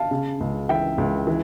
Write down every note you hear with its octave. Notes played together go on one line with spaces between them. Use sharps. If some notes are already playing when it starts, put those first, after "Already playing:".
Already playing: F5 A5
C#3
C#2
E3 E5 G5
C#2
E3